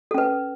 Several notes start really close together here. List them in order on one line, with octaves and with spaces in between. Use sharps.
A4 C#4 B4